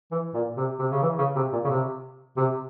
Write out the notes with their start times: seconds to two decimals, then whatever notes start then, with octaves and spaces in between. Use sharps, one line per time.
0.11 E3
0.34 A#2
0.57 C3
0.79 C3
0.92 C#3
1.02 E3
1.18 C#3
1.36 C3
1.53 A#2
1.64 C#3
1.69 C3
2.37 C3